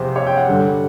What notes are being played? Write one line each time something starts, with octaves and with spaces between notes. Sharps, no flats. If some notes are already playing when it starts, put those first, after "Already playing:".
Already playing: E2 C3 F3 G#3 C5
C#5
G5
F#5
G2 D3 G3